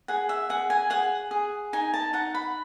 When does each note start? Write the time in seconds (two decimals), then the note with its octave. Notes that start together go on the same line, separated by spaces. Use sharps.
0.08 G#4 F#5
0.29 E5
0.50 G#4 F#5
0.70 G#5
0.90 G#4 F#5
1.31 G#4
1.73 D#4 G#5
1.94 A5
2.13 D#4 F#5
2.35 B5